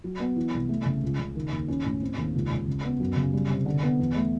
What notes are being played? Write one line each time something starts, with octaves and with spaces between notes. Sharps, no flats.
F#3
B3
E3
C2
A3
C#3
C#2
C#3
D#3
D#2
C#4
A2
C4
D#2
C#2
C#2
C#3
B3
F#2
C#3
G3
C3
D3
B3
E2
A3